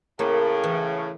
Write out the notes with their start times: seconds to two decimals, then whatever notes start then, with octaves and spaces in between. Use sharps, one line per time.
0.19 A2 C#3 A#3
0.64 E3